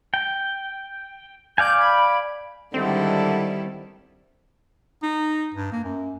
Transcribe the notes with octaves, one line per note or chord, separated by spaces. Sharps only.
G5
D5 F5 G#5 G6
B5
G#2 D3 D#3 G3 C4 E4
D#4
G2
A#3
F#2